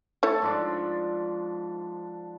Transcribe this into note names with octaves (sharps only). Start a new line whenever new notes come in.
A3 E4 A4 C#5 A5
G#2 F3 D4